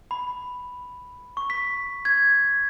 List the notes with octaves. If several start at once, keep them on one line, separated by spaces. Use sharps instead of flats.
B5
C#6
B6
G#6